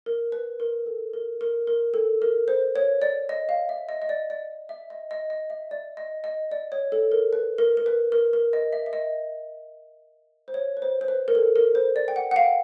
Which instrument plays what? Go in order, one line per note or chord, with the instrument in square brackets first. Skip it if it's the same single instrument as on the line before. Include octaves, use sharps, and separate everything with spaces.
[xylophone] A#4
B4
A#4
A4
A#4
A#4
A#4
A4
A#4
C5
C#5
D5
D#5
F5
E5
D#5
D#5
D5
D5
E5
D#5
D#5
D#5
E5
D5
D#5
D#5
D5
C#5
A4
A#4
B4
A#4
A#4
B4
A#4
A#4
D#5
E5
E5
D#5
C5
C#5
B4
C5
C5
B4
A#4
A4
A#4
C5
D5
G5
F#5
F#5
F5 G5